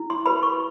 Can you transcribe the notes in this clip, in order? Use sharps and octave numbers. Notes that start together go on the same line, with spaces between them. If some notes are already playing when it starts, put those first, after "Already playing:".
Already playing: E4
C6
G4 B4 B5
C#6